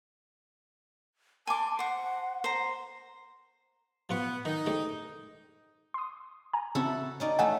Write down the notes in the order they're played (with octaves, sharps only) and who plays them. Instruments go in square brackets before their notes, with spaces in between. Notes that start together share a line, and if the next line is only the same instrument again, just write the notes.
[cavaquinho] G#5 C6 D6 [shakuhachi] A5
[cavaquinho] C5 C#6 [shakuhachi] F#5
[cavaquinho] C5 A#5
[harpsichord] F3 F4 C#6 [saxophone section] B3
[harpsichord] D#3 [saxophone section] D#4
[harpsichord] D3 G#3 C4
[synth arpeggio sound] C6 D#6
G#5 A#5
[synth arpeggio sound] C#3 C4 [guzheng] E4 F#4 A4
[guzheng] C#4 D#4 D5
[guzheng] A3 A4 [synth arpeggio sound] D#5 F#5 G#5